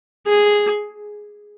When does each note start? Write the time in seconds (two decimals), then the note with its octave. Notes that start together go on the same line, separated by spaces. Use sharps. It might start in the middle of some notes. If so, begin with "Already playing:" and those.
0.27 G#4